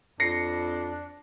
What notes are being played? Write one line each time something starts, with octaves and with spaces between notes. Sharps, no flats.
F2 D4 A#6 C7 C#7